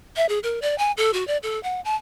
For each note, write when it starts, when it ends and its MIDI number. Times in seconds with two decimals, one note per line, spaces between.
0.16 0.28 76
0.29 0.39 68
0.43 0.60 70
0.62 0.77 74
0.78 0.92 80
0.97 1.11 69
1.14 1.26 66
1.28 1.37 74
1.43 1.61 69
1.63 1.81 78
1.85 1.95 81